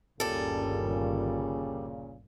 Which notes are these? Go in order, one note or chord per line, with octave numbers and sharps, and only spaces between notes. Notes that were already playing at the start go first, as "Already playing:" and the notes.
G1 D#2 A#2 C#3 G3 A4